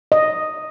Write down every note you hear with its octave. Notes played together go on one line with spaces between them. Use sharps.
D#5